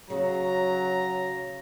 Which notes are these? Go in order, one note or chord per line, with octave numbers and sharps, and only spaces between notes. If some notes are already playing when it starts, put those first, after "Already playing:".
C#3 F#3 A#5